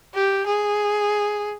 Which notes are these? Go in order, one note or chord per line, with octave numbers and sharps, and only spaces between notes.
G4
G#4